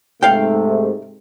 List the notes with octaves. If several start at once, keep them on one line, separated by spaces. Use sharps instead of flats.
G#2 C3 A3 F5 G5